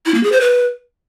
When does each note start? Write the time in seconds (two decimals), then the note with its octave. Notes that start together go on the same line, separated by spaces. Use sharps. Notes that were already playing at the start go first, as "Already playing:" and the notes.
0.06 E4
0.14 A#3
0.23 G#4
0.32 C5
0.41 B4